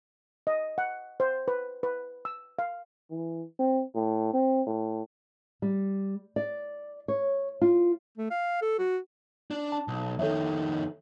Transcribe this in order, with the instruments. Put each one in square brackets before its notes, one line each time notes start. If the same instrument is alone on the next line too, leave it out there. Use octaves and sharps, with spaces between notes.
[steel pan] D#5
F#5
C5
B4
B4
E6
F5
[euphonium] E3
C4
A2
C4
A2
[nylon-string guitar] G3
D5
C#5
F4
[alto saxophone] A3
F5
A4
F#4
[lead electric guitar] D4
[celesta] A5
[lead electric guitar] B1
[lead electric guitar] F2 D#3 [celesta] A4 C#5 E5